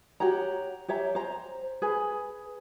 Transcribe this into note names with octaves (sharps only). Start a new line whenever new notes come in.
F#4 G4 C#5 A#5
G4 C#5 E5 A#5
C5 A#5
G#4 B4 G#5